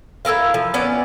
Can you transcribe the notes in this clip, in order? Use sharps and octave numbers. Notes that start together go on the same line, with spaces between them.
E4 A4 A#4 F5
F3
B3 C#4 D5